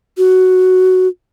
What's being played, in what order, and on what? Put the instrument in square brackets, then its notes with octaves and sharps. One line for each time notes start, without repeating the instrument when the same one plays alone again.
[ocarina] F#4